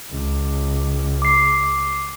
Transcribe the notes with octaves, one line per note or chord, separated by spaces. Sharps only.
C#2
D6 C7